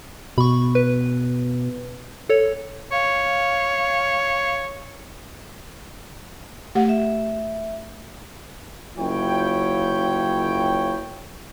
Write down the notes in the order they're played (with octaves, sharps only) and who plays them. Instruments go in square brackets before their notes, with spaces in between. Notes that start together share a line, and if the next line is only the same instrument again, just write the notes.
[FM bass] B2 [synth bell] B5 C#6
[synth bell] B4
A4 C#5
[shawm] C#5 [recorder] F5
[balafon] A3 G4 F#5
[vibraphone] E5
[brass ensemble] F#1 F#2 E4 F4 C#5 G5